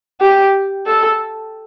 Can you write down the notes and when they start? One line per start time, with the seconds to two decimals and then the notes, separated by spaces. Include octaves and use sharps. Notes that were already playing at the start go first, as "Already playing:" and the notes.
0.21 G4
0.86 A4